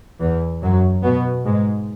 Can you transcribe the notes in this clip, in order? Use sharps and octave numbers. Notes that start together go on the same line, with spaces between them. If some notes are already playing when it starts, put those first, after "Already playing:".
E2 E3
F#2 F#3
B2 B3
G#2 G#3